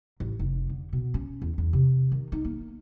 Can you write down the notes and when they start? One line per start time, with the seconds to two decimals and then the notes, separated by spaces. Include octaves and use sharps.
0.20 A1
0.39 F1
0.69 D3
0.93 B2
1.14 C#4
1.42 E2
1.58 E2
1.73 C3
2.12 D#3
2.32 D#4
2.45 A#3